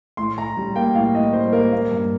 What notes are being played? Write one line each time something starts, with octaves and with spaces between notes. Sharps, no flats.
A2 C6
A2 A#5
G3
A#3 G5
A2 F5
A2 D#5
G3 C5
A#3 A#4
A#3
G2